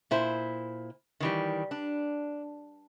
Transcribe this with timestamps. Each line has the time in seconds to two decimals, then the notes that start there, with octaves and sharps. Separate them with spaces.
0.11 A#2 E4 C5
1.20 D#3 E3 G3
1.71 D4